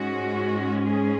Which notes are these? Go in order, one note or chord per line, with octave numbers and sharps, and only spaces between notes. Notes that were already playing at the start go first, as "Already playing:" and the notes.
Already playing: G#2 G#3 C#4 F#4
G#4